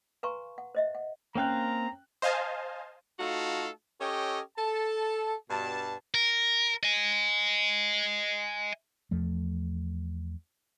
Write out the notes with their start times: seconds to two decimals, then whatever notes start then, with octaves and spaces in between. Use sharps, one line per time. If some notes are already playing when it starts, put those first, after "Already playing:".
0.23 B4 F5 G#5 A#5 C6 C#6
0.58 F#5
0.75 C5 D#5 E5
0.95 F#5
1.35 A#3 C4 C#4 F5 G5 A#5 F#6
2.22 C5 D#5 F5 G#5 A5
3.19 A3 D#4 F4 F#4 A4 F5
4.00 C#4 G4 A4 C#5 D#5 G5
4.57 A4 A5
5.50 G2 B2 A5
6.15 A#4
6.83 D#5 G#5
9.11 E2 F3 A3